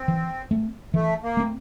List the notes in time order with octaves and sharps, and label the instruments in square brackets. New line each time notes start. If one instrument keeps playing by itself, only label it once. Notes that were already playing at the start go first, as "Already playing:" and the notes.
Already playing: [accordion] C4
[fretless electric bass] E3
A3 C4
[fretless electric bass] E3 [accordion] A3
[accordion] A#3
[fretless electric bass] A3 C4